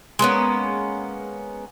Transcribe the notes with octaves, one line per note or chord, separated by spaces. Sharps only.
G#3 A#3 B3 C#4